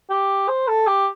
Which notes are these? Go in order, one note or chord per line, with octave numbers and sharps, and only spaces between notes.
G4
C5
A4
G4